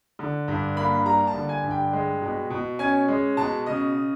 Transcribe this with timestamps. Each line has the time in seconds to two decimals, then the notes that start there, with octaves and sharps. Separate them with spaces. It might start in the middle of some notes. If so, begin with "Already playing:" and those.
0.19 D3
0.48 G2
0.76 A#3 B5
1.06 G3 A#5
1.27 A5
1.34 D3
1.49 G#5
1.63 G2
1.71 G5
1.93 G#3
2.22 B2
2.50 B2
2.79 C#4 G#5
3.08 G#3
3.37 B2 A5
3.66 C#3 D#5